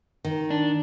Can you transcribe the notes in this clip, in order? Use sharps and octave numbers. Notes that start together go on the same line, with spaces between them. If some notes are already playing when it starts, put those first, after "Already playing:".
D#3
D4